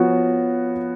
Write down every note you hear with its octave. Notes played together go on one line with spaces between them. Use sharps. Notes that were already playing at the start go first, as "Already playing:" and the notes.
Already playing: F3 B3 F#4 C#5